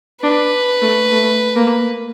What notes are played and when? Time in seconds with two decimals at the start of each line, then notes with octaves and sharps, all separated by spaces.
0.23 D4 B4
0.82 A3
1.12 A3
1.56 A#3